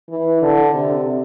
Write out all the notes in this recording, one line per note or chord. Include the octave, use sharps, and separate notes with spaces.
E3
D3
C3